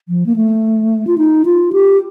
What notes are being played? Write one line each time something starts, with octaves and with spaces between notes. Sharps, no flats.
F3
A#3
A3
F4
D#4
F4
G4